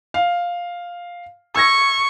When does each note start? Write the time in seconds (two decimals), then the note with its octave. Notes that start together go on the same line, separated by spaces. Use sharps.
0.14 F5
1.56 C#6 E6 G#6 A#6